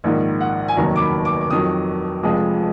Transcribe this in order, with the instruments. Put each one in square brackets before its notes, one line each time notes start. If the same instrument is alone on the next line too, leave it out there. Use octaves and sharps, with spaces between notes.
[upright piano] A#1 G#2 D#3
F#5
G#5
F1 D#2 D#3 F#3 A#5
D6
B5
D6
D6
F2 D#3 F#3 D#6
F1 F2 F3 G#3 D#6